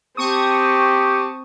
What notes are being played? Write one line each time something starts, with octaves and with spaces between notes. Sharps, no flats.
C4 G4 A5 C#6 D#6